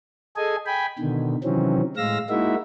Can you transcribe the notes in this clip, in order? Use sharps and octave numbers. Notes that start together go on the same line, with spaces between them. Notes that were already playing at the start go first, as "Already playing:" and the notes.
G#4 A4 D#5 G#5
G5 G#5 B5
B2 D3 D#3
C3 D#3 E3 F#3 C4 C#4
A2 G#3 F5 E6 A#6
G#3 A#3 D#4 E4 F#4 E5